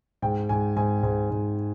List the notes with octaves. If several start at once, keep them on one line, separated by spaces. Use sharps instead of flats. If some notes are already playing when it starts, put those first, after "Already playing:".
G#2 G5
G#2 G#5
G#2 G#5
G#2
G#2